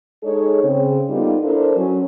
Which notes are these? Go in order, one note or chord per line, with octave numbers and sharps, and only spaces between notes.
G#3 D#4 G#4 A4 C#5
C#3 C4
G3 A#3 B3 D#4 F4 A4
D4 E4 A4 A#4 C5
F#3 C#4